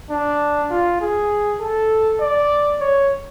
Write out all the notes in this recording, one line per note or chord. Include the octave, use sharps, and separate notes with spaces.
D4
F4
G#4
A4
D5
C#5